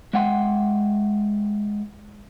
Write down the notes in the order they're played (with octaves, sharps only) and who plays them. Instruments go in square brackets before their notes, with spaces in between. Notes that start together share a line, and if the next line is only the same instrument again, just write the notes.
[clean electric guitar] G#3 E5 F#5 G5 C6